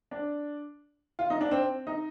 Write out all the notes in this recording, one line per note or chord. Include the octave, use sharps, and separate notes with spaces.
D4
F4
D#4
D4
C4
D#4